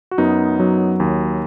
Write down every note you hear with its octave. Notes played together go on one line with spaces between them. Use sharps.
F#4
F#2 B3 D#4
F#3
D#2